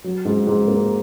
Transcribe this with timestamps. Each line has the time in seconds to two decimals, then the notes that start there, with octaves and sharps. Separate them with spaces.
0.04 F#3
0.25 G#2
0.47 G#2
0.68 A#3